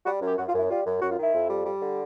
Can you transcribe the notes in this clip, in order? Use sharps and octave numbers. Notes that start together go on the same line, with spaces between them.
G3 F#4
F#2
G4
F#2 F#4
F4
F#2 E4
G3 F4
F#2
F#2 F#4
F4
D#3 E4
F2
G3
G3
D3